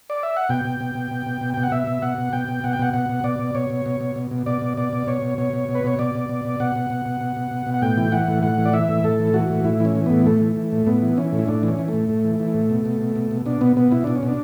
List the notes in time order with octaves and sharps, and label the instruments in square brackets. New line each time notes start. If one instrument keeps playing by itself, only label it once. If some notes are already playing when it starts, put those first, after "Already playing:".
[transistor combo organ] D5
E5
F#5
B2 G5
B2
B2
B2
B2
B2
B2
B2 G5
F#5
B2 E5
B2
B2 F#5
B2
B2 G5
B2
B2 F#5
G5
B2 F#5
B2 F#5
B2
B2 D5
B2
B2 C#5
B2
B2
B2
B2
B2
B2 D5
B2
B2 D5
B2
B2 C#5
B2
B2 C#5
B2
B2
B4
B2 C#5
B2 D5
B2
B2
B2
B2 F#5
B2
B2
B2
B2
B2
B2
B2
F#5
A2 G5
E3
E3 F#5
A2
A2 F#5
E3
D5
E3 E5
A2
A2 A4
E3
E3 F#4
A2
A2 E4
E3 C#4
E3
A2 B3
A2 A3
E3
E3
A2
A2 B3
E3
E3 C#4
A2
E4
A2 D4
E3
C#4
E3
A2 A3
A2
E3
E3
A2
B2
B2
B2
B2
B2
B2 D4
B2 B3
B2 B3
B2 E4
B2 D4
C#4
B2
D4